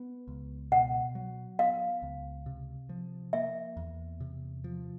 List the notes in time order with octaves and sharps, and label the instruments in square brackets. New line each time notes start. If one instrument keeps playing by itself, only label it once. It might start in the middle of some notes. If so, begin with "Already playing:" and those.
Already playing: [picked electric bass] B3
C#2
[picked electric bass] B2 [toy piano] F#5
[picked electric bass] F#3
[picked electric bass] B3 [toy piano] F5
[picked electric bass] C#2
C3
F3
[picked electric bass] A#3 [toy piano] E5
[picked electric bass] E2
C3
F3